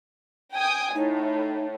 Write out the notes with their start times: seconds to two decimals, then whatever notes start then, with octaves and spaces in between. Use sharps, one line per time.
0.55 G5 G#5 D#6
0.95 A2 D#4